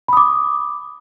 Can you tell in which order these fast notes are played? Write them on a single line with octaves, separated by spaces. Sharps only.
B5 D#6 D6